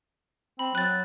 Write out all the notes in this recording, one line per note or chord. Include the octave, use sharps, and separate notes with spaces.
C4 B5
F#3 F#6 A6